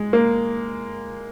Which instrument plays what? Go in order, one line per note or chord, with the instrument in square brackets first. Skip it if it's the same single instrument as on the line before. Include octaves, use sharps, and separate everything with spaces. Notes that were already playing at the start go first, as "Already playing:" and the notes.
Already playing: [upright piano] G#3
A#3